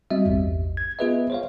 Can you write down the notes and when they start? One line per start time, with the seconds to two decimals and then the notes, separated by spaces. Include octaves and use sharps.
0.10 G3 C4 F#4 D#5 E5
0.25 A1 E2 G2
0.77 G#6
0.99 B3 F4 G#4 B4 D#5 E5
1.30 C5 C#5 F5